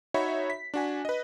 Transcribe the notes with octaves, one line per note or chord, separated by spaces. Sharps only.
D#4 F#4 C#5 E5 B5
B6
D4 F#4 G#5
B4 D#5